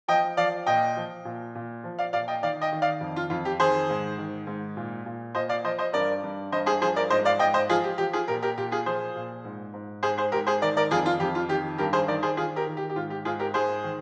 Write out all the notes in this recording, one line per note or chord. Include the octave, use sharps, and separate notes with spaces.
F3 D#5 G5
F3 D5 F5
A#2 D#5 G5
F3
A#2
A#2
F3
D5 F5
A#2 D5 F5
D#5 G5
D#3 D5 F5
D#5 G5
D#3
D5 F5
F2
F4
F2 F4
G4
D#3 G#4 C5
G#2
D#3
G#2
A#2
A#2
A#2 C5 D#5
D5 F5
F3 C5 D#5
C5 D#5
G2 A#4 D5
G2
G2 C5 D#5
G#4 C5
F3 G#4 C5
A#4 D5
G#2 C5 D#5
D5 F5
G#2 D#5 G5
C5 D#5
F3 F4 G#4
G4
F3 G4
F4 G#4
A#2 G4 A#4
G4 A#4
A#2 G4
F4 G#4
F3 G#4 C5
A#2
G#2
G#2
G#2 G#4 C5
G#4 C5
G#2 G4 A#4
G#4 C5
D#3 A#4 D5
A#4 D5
F2 F4 G#4
F4
F2 G4
F4
D#3 G4
G2 G4 A#4
G#4 C5
D#3 A#4 D5
G#4 C5
D#3 F4 G#4
G4 A#4
D#3
G4
G4
G#2 F4
G4
G#2 F4 G#4
G4 A#4
G#2 G#4 C5
D#3